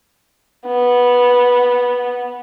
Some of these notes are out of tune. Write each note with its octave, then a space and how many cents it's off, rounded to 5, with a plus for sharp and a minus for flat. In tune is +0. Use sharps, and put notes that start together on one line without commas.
B3 -10